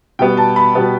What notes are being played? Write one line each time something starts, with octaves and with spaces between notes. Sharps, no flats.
B2 G3 B3 G5
A5
B5
B2 G3 B3